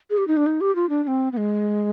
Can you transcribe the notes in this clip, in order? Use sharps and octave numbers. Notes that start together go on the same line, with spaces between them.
G#4
G4
D#4
D4
D#4
G4
F4
D4
D4
C4
B3
G#3